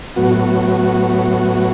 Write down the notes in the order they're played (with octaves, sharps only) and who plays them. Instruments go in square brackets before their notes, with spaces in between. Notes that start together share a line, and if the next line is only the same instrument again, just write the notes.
[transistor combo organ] A2 F#3 B3 F#4